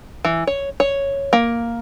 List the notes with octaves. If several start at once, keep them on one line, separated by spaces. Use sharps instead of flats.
E3
C#5
C#5
A#3